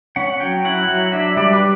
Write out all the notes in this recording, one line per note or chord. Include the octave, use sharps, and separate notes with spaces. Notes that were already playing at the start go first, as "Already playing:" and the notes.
C#4 F#5
F#3 G5
E4 F#5
F#3 F#5
D4 E5
G3 D5
B4